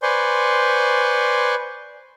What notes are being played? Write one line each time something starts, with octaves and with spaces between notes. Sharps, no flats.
B4 C5 D5 G#5 C6 C#6